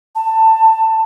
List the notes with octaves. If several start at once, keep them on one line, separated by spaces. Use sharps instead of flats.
A5